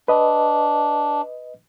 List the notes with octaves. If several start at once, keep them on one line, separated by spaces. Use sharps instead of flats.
D4 B4 D#5